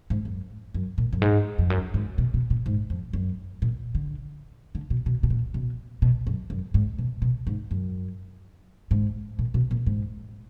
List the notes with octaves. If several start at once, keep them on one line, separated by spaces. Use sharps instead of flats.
G#2
F#2
F#2
A#2
F#2
G#2
F2
F#2
G#2
B2
B2
A#2
G#2
F2
F#2
A#2
D3
D3
B2
B2
B2
A#2
B2
B2
F#2
F#2
G#2
B2
B2
G#2
F#2
G#2
A#2
B2
A#2
G#2